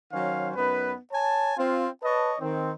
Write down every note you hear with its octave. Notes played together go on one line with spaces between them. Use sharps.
D#3 F#3 C#4 C5 F5
F#2 B3 D#4 B4
C#5 G#5 A5
C4 F4
B4 C#5 D#5 A5
D#3 C4